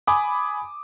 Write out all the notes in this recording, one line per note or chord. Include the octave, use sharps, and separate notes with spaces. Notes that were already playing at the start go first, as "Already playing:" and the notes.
G#5 B5 D6 D#6